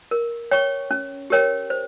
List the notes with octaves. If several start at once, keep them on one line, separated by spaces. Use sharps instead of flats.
A#4
C#5 G5 C#6
C#4
G4 A#4 C#5 G5
C5